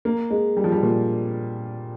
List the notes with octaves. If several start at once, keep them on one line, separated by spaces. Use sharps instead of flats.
A#3
G#3
G3
F3
G3
A#2